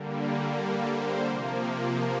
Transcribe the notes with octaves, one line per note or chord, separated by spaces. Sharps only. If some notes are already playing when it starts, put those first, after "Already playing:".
Already playing: D3 G3 A#3
A#4 D5
C5
C3 F3 A#3